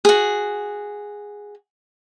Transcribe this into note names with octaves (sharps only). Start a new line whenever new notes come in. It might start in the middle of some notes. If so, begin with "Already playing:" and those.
F#4 G#4